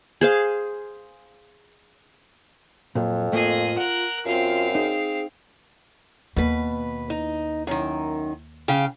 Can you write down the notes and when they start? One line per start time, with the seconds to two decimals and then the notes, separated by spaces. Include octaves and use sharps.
0.21 G#4 C5 F5
2.95 F2 A#2 F#3
3.32 A2 A3 A#3 F4 G#4 D#5
3.77 A#4 F#5 F#6
4.26 F#2 C4 F4 F5
4.75 D#4 G#4
6.36 D#2 B2 A#3 B4
7.10 D#4
7.67 F#2 D#3
8.68 C#3 F5 G5